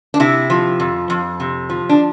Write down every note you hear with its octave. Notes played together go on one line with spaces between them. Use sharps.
D4
C3 E4
F3
F2
F2
C3
F3
D4